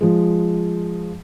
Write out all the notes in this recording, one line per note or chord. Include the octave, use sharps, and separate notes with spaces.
F3 G#3